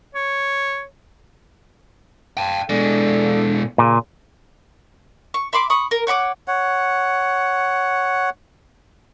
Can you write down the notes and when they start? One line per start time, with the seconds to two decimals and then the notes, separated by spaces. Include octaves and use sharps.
0.15 C#5
2.37 G5 A5
2.70 B2 G#3 D4 A4
3.78 A#2 C#3
5.34 C#6
5.53 E5 B5 C6 D6
5.70 B5 C#6 D#6
5.91 A#4
6.07 C#5 F#5 B5 D6
6.48 C#5 F#5